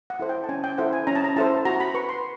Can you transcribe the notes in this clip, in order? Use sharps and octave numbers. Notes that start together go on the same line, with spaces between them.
F#5
E4 A4 C5
G5
A5
C#4 G#5
G5
E4 A4 C5 F#5
G#5
C#4 A#5
A5
A#5
E4 A4 C5 A5
F#4 A#5
B5
B4 C#6
C6